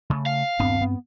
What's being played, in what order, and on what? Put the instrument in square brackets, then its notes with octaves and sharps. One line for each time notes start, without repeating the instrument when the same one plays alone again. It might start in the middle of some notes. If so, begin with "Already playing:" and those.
[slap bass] C#3 A3
[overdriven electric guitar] F5
[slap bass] D#1 B3 D4 [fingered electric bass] G2 C4
[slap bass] B3